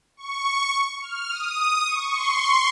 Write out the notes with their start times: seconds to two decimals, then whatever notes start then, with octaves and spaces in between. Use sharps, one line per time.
0.17 C#6
1.02 F6
1.30 D#6
1.86 C#6
2.14 C6